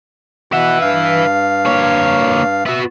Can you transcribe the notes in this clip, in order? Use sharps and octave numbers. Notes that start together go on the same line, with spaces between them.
B2 B4 E5 F#5
G2 F5
A#3 C#5
B3 F#4 E5